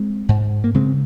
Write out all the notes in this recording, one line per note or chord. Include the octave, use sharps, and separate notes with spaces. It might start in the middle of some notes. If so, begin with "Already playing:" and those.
Already playing: G#3 C4
G#2
A#3
C#3 G#3 C4